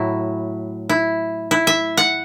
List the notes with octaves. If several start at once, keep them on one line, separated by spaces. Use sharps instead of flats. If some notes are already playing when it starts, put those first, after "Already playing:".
Already playing: A2 F#3 E4
E4
E4
E5
F#5